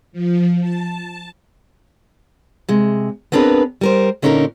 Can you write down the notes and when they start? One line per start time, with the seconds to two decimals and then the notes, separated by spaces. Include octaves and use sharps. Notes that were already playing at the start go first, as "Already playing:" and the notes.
0.12 F3
0.61 A5
2.69 C3 G#3
3.32 B3 C4 D4 G#4 A#4 B4
3.81 G3 A#4 C5
4.22 A#2 D3 C#4 D#4 A4 A#4